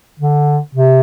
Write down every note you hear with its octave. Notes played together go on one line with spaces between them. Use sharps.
D3
C3